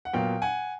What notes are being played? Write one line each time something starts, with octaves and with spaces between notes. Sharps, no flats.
F#5
A#2 F#3 B3 F5 G5
F#5 G#5